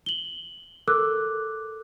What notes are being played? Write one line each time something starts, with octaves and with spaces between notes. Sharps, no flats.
F#7 G7
A4 A#4 D6 E6 F#6